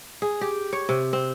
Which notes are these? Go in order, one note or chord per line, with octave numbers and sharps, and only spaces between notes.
G#4
G4
C#5
C3
C4